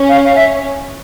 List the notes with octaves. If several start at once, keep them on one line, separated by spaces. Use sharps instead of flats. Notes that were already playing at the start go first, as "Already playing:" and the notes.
Already playing: C#4
F5
F5
E5